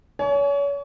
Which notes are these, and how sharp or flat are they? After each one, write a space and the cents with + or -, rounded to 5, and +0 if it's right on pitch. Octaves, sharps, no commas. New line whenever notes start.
C#5 +35 G#5 +35